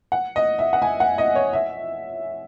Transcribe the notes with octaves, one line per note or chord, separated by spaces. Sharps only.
F#5
D#5
E5
F#5
G#5
F#5
D#5
C#5
E5